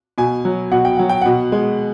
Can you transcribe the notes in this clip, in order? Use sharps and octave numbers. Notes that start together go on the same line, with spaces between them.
B2 G#5
F#3
B2 F#5
G5
F#3 F#5
G5
B2 F#5
G#3